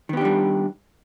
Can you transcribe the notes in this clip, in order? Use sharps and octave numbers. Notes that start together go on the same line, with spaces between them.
D#3 G3 B3 D4 G4